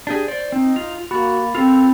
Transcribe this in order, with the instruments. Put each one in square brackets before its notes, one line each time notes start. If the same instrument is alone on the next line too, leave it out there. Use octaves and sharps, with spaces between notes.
[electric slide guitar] D4 G4 G#4
C5 D5
[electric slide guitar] C4 [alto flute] D#4
[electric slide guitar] F4 [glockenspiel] F7
[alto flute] A#3 [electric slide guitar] F#4 [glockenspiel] B5 A6
[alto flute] C4 [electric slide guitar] F4 A4 [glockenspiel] F7